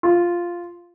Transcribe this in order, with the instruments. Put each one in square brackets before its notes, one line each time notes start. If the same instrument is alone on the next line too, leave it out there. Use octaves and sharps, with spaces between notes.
[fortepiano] F4